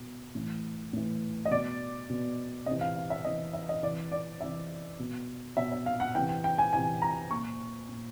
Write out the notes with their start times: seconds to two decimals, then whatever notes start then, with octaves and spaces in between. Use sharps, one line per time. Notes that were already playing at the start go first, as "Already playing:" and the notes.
Already playing: B2
0.35 A2 E3
0.93 A2 E3
1.45 D#5
1.51 B2 D5
2.10 B2
2.66 C3 E3 D#5
2.81 F5
2.96 F5
3.10 E5
3.25 C3 E3 D#5
3.53 E5
3.69 D#5
3.83 C3 E3 D5
4.12 D5
4.41 C3 E3 E5
4.99 B2
5.57 B2 E5
5.72 E5
5.86 F5
6.00 F#5
6.15 C3 E3 G5
6.29 G5
6.44 G5
6.58 G#5
6.73 C3 E3 G#5
7.02 A#5
7.31 A#2 C#6
7.89 A#2